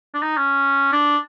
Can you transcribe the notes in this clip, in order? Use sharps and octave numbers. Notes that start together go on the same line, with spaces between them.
D4
D#4
C#4
D4